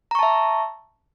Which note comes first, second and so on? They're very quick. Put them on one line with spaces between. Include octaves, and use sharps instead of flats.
A#5 C#6 A5 E5